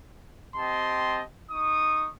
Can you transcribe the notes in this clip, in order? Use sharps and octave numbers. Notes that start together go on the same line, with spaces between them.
C4 G4 D#5 A5 C6
D#4 C#6 D#6